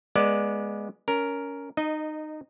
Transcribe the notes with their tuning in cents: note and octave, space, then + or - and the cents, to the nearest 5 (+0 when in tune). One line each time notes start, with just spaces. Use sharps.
G#3 +0 B3 -20 D5 +5
C#4 +20 A#4 +0
D#4 -20 D#5 +0